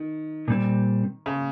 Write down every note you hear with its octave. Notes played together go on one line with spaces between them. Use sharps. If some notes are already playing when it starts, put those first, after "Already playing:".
Already playing: D#3
A#2 G3 C4
C#3